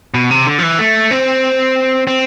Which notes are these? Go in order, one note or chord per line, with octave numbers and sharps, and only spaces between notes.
B2
C3
D3
F3
E3
A3
C4
C4